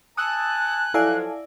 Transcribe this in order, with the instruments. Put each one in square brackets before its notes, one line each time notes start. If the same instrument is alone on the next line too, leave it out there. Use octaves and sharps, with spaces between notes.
[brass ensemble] G#5 A5 [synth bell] D#6 E6 [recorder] F#6
[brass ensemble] F3 F#3 [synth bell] E4 D5 [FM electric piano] A4 F5 G#5